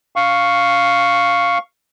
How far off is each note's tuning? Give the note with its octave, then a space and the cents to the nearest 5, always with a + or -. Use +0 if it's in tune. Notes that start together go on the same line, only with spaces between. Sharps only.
F5 +0 C#6 +0